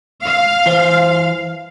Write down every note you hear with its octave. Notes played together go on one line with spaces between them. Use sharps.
F5
E3 C5